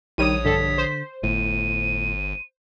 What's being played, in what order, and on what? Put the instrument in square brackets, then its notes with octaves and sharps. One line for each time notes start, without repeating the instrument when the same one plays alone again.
[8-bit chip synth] A#1 C#5 D#6 [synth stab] D#3 G3 D#7
[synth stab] G2 A4 [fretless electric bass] D3 [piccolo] B6
[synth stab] C5
[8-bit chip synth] G1 [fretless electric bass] A2 [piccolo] D#7